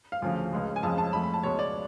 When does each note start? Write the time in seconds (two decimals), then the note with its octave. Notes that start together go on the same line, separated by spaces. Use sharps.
0.12 F5
0.22 D2 C#3 F3
0.53 C#2 C#3 G#3
0.76 G#5
0.83 F2 C#3 F3 G#3 A5
0.98 A5
1.13 F2 F3 A3 B5
1.23 B5
1.34 A5
1.43 C#2 B2 G#3 C#5
1.59 D5